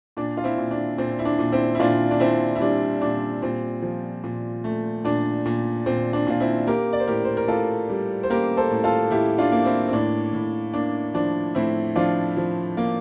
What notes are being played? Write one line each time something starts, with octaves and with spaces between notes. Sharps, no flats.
A#2 D4
F4
C4 E4
A#2
D4
A#2 C4
E4
D4
A#2
C4 E4
E4
A#2 D4 F4
D4
A#2 C4 E4
E4
G3 D4
A#2 D4
A#2 C4
F3
A#2
A3
A#2 D4
A#2
A#2 C4
D4
A#2 F4
C4 E4
A#3 G4 A#4
D5
C5
A2 G4 A#4
C5
A#4
A2 F4 A4
G3
C5
A#3 G4 A#4
A4 C5
A2
F4 A4
A2 E4 G4
D4 F4
A#3
C4 E4
C4
A2 D4
A2
A#3 D4
F3 D4
A2 C4 E4
F3 D4 F4
F3
A#3